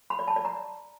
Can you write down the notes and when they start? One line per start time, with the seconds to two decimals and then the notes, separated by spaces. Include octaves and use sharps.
0.10 B5
0.19 D5
0.28 A5
0.36 D5
0.45 A#5